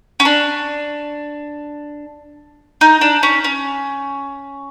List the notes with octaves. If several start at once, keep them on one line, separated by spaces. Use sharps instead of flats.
C#4
D4
D#4
D4
C#4
C#4